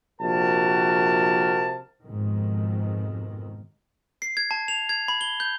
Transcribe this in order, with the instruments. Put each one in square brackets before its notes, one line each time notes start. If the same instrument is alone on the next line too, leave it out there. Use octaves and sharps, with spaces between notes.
[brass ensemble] A#1 C3 F#4 A#4 A5
[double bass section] F2 G#2 B2 D#3
[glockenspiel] C7
G#6
A5
F7
G#6
B5
G7
G6